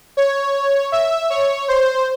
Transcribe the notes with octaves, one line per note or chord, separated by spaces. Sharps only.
C#5
E5
C#5
C5